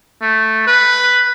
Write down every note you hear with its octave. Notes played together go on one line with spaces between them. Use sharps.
A3
B4